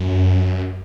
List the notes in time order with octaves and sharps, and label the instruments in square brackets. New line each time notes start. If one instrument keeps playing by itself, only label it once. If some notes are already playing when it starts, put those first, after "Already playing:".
Already playing: [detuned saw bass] F#2